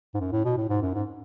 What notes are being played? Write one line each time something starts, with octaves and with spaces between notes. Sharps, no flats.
G#2
F#2
A2
B2
A2
G#2
F#2
G#2